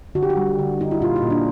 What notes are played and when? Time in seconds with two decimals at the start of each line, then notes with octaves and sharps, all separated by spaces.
0.15 D3 F#4
0.23 G4
0.30 F#4
0.37 G3
0.59 D3
0.80 D3 D#4
0.91 E4
1.01 A#2 F4
1.16 D#4
1.22 A#2
1.30 D4